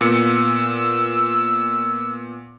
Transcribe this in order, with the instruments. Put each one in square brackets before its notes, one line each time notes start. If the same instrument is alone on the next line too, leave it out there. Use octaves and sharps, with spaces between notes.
[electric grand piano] A#2 B3 C#7 [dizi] E6